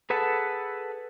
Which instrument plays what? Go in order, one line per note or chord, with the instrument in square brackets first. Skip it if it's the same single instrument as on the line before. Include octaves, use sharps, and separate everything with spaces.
[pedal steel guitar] G#4 A4 B4 F#5 A5